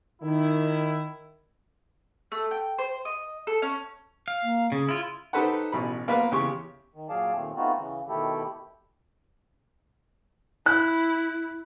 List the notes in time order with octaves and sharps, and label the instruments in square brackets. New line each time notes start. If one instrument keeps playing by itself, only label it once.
[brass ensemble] D#3 E4
[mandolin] A3
G5
C5
D#5
A4
C#4
[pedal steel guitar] F5
[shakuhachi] A#3
[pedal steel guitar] C#3 [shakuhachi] G#4
[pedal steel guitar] E4 F4
[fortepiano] D#4 G4 A4 B4 C5 F#5
A1 B2 B5
A#3 B3 F4 B4
E2 C#3 G4 C6 C#6
[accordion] D#3
A#2 F#3 G#4 D5 F5 A5
D#2 A#2 A3 C4
A3 B3 C4 D#4 F4 F#4
C#3 E3
B2 D#3 A3 E4 G4 A4
[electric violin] E4 [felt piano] F#6